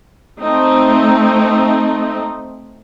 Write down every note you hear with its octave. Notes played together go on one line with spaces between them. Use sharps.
A3 C4 D#4